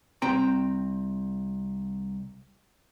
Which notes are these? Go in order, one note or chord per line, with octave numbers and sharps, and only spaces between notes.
C2 C4 G5 A#5